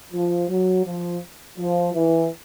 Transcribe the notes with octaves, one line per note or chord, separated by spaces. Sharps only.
F3
F#3
F3
F3
E3